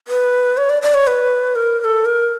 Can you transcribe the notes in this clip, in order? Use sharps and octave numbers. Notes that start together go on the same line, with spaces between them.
B4
C#5
D5
D5
C#5
B4
A#4
A#4
A4
A#4